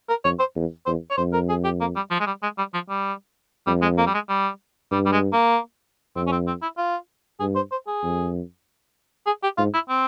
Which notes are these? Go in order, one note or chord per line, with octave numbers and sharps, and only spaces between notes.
A#4
F2 C#5
C5
E2
E2 C5
C#5
F2 C5
A#4
G#4
G4
A#3
G3
F3
G#3
G3
G#3
G3
F3
G3
F2 G3
G#3
A#3
G3
G#3
G3
G2 G3
G3
G#3
A#3
F2 C4
C#4
C4
C4
E4
F4
G2 G#4
C5
C5
G#4
F2
G#4
G4
G#2 F4
E4
C4